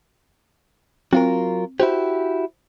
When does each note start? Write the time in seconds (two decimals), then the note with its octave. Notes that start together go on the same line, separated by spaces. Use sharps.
1.13 F#3 C4 F4 A#4
1.80 E4 F#4 G4 C5